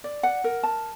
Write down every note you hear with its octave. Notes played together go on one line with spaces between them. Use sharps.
D5
F#5
A#4
A5